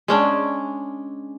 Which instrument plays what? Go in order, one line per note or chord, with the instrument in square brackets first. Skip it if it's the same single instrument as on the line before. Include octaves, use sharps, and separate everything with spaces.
[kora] G#3 C#4 D4